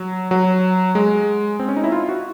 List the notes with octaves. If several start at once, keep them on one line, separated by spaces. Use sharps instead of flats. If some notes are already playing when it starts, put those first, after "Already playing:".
Already playing: F#3
F#3
G#3
C4
C#4
D#4
E4
F4
F#4